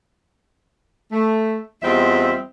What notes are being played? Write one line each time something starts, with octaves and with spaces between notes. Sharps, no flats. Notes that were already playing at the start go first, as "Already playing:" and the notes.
A3
E2 G3 C4 F4 D#5 E5